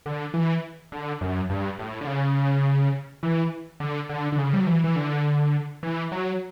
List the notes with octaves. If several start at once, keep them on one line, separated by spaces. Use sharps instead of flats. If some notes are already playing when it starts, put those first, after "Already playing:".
D3
E3
D3
F#2
G2
A2
D3
C#3
E3
D3
D3
D3
C#3
G3
F#3
E3
E3
D3
E3
F#3